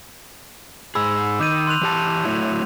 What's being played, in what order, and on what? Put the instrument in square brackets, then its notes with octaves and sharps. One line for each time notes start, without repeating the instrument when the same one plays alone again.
[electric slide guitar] G#2 G#4 [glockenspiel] B5 E6
[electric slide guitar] D#3 [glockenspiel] D6 G6 D#7
[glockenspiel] C6 F#6 F7
[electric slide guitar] E3 G4 A5
F#3 A3 E4